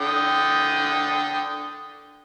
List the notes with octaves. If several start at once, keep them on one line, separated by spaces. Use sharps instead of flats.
D3 G5 D#6